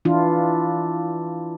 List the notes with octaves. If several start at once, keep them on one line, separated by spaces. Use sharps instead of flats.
E3 D4 E4 F4